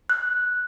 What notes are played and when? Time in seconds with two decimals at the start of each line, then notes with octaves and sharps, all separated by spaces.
0.10 F#6